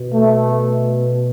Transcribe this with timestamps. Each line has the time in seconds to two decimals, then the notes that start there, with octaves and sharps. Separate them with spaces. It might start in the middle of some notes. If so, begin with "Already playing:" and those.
Already playing: B2
0.14 A3